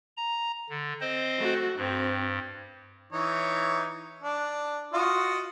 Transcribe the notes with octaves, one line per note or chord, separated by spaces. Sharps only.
A#5
D3
C4 C5 D#5
A3 F#4
G2 C4
E3 D#4 C#5
D4
F4 F#4 D#5